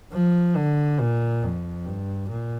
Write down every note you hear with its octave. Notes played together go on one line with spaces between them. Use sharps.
F3
D3
A#2
F2
G2
A#2